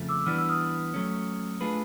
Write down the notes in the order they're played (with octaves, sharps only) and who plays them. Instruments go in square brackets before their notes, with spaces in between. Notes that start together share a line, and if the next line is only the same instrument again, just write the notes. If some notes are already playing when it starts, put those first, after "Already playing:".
Already playing: [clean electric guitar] F2 C#3 F3 A3
[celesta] D6 E6
[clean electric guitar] E3 G3 B3 D4 [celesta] F6
[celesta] E6
D#6 F6
[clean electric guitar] F#3 A3 C#4
A3 D4 F4 G#4 B4